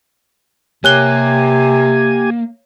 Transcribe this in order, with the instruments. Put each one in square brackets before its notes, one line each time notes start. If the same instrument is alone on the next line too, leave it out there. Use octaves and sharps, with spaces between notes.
[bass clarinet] C3 [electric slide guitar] A#3 [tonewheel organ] G4 G#5 [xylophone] C#5 F#6 G7